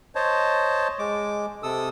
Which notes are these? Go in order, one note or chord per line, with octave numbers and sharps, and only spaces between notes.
C5 C#5 D#5 A5
G#3 D6
C3 A4 D#6 E6